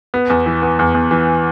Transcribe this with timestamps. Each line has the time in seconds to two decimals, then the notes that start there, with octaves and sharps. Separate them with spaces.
0.14 B3
0.30 E2
0.46 E3
0.62 B3
0.79 E2
0.94 E2
1.11 E3